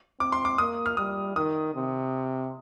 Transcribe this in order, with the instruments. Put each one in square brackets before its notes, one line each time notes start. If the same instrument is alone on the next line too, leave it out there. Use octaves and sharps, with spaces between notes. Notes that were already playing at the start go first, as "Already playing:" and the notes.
[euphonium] C4 [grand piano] D6
[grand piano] C6
D6
[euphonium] A#3 [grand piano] D#6
[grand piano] F6
[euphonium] G3 [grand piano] D#6
[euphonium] D#3 [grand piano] D#6
[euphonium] C3